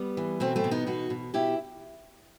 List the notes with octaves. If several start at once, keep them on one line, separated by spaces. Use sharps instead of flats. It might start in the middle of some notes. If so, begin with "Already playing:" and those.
Already playing: G3 B3
E3
B2 A3 C4
A3 C4
B2
B3 D#4
B2 D#4 F#4
B2
B2 E4 G4